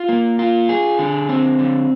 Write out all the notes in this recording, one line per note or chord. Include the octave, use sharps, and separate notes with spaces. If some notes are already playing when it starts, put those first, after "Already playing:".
Already playing: F4
A#3
F4
G#4
D3
C4
D3